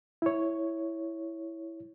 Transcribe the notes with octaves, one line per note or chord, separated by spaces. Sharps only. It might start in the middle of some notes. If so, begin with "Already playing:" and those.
E4 C#5